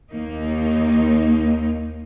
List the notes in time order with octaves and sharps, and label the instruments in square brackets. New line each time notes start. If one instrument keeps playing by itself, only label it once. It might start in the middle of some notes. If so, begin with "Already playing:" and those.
[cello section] D#2 A#3 D#4